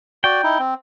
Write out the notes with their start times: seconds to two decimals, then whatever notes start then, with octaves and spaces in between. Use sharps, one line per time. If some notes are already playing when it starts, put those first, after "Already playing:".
0.24 F#4 D5 G5
0.43 D#4 E4
0.59 C4